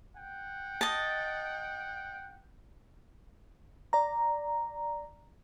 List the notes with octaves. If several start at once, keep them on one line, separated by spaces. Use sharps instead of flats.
F#5 G5
D#5 A5
D5 A#5